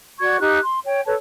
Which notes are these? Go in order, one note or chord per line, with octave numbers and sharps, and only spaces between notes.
F#4 D5 C#6 G#6
D#4 G4 F#6
C6
C#5 G5
A4 B4 C#5 A5